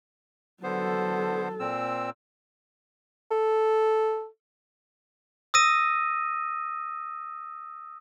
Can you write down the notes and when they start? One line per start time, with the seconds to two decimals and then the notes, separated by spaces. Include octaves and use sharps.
0.63 D3 F#3 B3 A4 C5
1.60 A#2 C4 E6
3.31 A4
5.54 D#6 E6 A#6 D#7